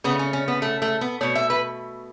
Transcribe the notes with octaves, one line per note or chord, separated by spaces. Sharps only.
C#3 A3 B3
C#4
C#4
B3
A3
A3
B3
B2 A3 C#5
E5
B4